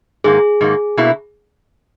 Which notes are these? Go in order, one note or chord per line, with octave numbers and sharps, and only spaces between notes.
G#2 D#3 A#3 G#4
G#2 D#3 A#3
B2 A#3 E4